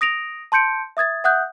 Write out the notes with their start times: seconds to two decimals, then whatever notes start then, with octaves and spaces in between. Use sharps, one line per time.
0.01 D#6 A#6 D7 F7
0.52 A5 C6 G6 C#7 D7
0.97 E5 D#6 G#6 A6
1.24 E5 F#5 D#6 F#6 G6